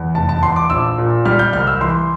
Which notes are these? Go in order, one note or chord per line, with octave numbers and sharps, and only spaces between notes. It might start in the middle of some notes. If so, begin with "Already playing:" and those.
Already playing: E2
F1 A5
A5
E2 C6
D6
A#1 E6
A#2
G3 F6
G6
C2 F6
E6
E3 C6